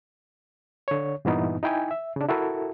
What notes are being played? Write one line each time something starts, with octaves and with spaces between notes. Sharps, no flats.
D3 C#5
G2 A#2 E3 B3 D#4
D#4 E4 G5 G#5
E5
C#3 D4
E4 F#4 A4 A#4 E5